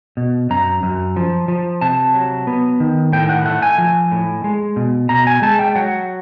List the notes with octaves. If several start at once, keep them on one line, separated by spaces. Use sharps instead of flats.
B2
F#2 A#5
F#2
F3
F3
C3 A5
F#3
B3
D#3
A2 G5
F#5
A3 F#5
G#5
F3
A2
G#3
B2
B2 A#5
G#5
G#3 A5
G5
F#3 F#5